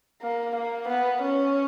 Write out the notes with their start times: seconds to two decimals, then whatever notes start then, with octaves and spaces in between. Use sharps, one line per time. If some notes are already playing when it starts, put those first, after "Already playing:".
0.22 A#3
0.55 A#3
0.88 B3
1.22 C#4